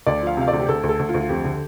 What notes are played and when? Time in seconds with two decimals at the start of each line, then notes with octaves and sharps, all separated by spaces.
0.06 D2 D5
0.22 F3 F5
0.37 C3 F5
0.48 D2 D5
0.60 G4
0.68 D2 A4
0.83 D2
0.89 A4
0.99 D2
1.09 F4
1.14 D2
1.20 F4
1.29 F2 G4
1.45 D3